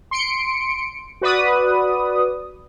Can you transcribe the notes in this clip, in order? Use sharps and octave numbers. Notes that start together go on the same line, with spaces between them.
C6 C#7 D7
F#4 B4 D5 D#6